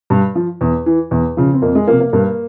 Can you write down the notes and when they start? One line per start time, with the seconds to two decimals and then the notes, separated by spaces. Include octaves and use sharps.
0.10 G2
0.35 F3
0.61 E2
0.86 E3
1.11 E2
1.37 C#3 F3
1.53 C4
1.62 F2 A#3
1.75 G#3
1.87 C3 F3 A#3
2.00 A#3
2.13 G2 A#3